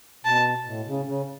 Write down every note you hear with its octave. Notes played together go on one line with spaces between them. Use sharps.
B2 A5
A2
C#3
C#3